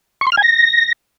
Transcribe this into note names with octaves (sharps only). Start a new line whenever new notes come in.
C#6
C6
F6
G#5
A#6